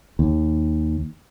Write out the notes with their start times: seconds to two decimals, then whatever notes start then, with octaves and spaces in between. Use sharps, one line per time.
0.19 D#2